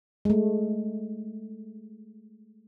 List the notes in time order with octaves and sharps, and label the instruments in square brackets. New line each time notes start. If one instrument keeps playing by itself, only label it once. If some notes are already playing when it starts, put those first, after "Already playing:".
[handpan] G#3 A3